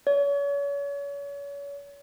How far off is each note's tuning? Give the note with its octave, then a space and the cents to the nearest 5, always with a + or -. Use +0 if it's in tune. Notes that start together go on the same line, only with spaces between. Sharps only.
C#5 +35